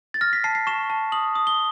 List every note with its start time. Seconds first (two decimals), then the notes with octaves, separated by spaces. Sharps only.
0.14 A6
0.21 F6 A#6
0.33 B6
0.44 A5 C7
0.55 C7
0.67 C#6 E7
0.90 A5
1.12 D#6 F#7
1.35 D#6
1.47 G7